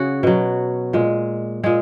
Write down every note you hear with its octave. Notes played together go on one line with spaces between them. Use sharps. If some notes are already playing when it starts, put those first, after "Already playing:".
Already playing: C#3 F#4 G#4
B2 F#3
A#2 G#3
A#2 G#3 G#4